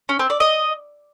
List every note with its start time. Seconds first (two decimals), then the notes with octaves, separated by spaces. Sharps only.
0.09 C#4
0.19 C4
0.30 D5
0.40 D#5